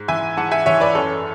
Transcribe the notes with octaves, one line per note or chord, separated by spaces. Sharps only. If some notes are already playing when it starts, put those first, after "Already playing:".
Already playing: G#2
E3 E5 G#5
G#2 F#5 A5
E5 G#5
E3 C#5 E5
B4 D5
F#2 A4 C#5